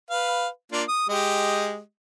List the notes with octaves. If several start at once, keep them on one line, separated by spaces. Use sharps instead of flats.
B4 F5
A#3 D4 F4
D#6
G#3 G4 D#5